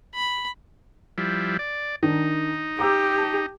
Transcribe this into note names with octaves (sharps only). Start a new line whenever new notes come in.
B5
F3 G3 E4
D5
D#3 D4 D#4
G4 A#5 D6 E6
A5